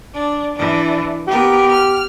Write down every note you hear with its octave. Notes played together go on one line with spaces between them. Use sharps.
D4
E3 D4
B3 G4 A#4
F6